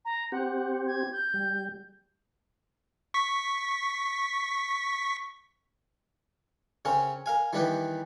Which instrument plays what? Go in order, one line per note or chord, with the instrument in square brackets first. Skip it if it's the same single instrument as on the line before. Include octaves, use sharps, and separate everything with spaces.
[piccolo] A#5
[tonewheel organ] C4 G4 [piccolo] F#5
[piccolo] G#6
G6
[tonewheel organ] G3
[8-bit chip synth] C#6 B6
[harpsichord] C#3 C4 C#4 A#4
A#4 F5 G#5
D#3 E3 G3 B3 G4 B4